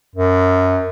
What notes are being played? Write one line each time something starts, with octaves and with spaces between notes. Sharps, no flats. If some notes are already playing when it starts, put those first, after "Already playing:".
F#2